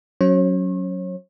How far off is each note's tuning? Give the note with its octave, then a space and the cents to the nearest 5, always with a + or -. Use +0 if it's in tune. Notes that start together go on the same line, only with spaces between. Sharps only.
F#3 +0 C#4 +0 C#5 -40